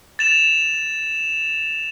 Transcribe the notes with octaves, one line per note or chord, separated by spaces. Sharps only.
A6 E7 F7